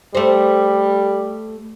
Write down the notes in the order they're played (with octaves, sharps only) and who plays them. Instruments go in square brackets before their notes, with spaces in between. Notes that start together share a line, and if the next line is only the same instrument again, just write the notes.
[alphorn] G3 [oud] A3 C5